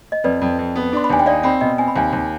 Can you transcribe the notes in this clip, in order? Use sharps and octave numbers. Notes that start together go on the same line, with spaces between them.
D#5
F2 B4 D5
F2
F2
B3
D4 C6
B5
D#2 G#5
G5
D#4 D5 F5
C4 G5 B5
B2 D#5 G5
C4 G#5
B5
D#2 F5 G#5
D#2